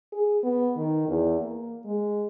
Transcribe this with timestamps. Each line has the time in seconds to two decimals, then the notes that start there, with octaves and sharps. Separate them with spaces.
0.13 G#4
0.43 B3
0.77 D#3
1.09 E2
1.39 A#3
1.85 G#3